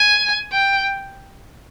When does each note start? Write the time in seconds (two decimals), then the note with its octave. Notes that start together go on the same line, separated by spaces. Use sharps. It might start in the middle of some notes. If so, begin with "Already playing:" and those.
Already playing: G#5
0.52 G5